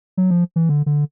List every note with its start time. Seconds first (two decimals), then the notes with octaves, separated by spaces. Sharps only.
0.17 F#3
0.30 F3
0.56 E3
0.69 D3
0.86 D3